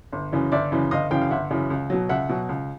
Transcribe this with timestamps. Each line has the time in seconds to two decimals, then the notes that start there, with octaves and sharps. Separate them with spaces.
0.12 G1
0.32 F#2 C#3 E3
0.52 G1 D5 E5
0.72 F#2 C#3 E3
0.91 G1 D#5 F5
1.11 F#2 C#3 E3 F5 G5
1.21 F5
1.30 G1 E5 F#5
1.51 F#2 C#3 E3
1.70 C#2
1.90 B2 F#3
2.09 C#2 E5 F#5
2.29 B2 F#3
2.49 C#2